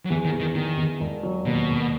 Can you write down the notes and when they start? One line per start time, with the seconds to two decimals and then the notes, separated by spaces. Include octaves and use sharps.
0.05 F#3
0.09 E2 E3
0.25 D#3
0.32 E2
0.40 D#3
0.55 E2 D#3
0.77 E2
1.00 E1
1.23 F#3
1.45 D#2 B2
1.68 E1